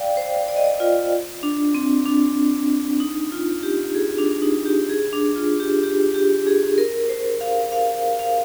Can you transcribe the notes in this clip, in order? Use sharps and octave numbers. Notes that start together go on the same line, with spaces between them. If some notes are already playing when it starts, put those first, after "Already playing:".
Already playing: D5 F5 G5
C5
D5
D#5
D5
F4
D4
C4
D4
D#4
F4
G4
G#4
D4
D4
D#4
G4
G#4
D4
F4
G4
G4
G4
G#4
A#4
C5
F5
F5
F5